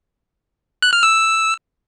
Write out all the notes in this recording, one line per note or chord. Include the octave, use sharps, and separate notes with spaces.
F#6
F6
E6